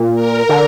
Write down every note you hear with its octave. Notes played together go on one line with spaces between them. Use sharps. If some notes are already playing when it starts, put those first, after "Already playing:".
Already playing: A#2
A#4
D3